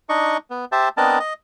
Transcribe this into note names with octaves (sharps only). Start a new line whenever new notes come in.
D4 D#4 D#5 C#6
B3
G4 C5 E5 A5
B3 C4 D4 A#4 D#5 A5
D#5